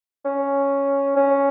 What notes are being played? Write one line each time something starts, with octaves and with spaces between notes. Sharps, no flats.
C#4
C#4